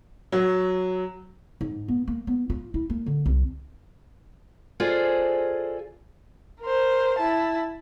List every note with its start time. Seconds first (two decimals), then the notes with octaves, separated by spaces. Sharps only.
0.32 F#3
1.61 G#2
1.88 B3
2.08 A#3
2.27 B3
2.50 F4
2.74 E4
2.90 A#3
3.06 D3
3.26 C2
4.80 F4 G#4 A4 C5 D5 D#5
6.61 A#4 C5
7.19 E4 A5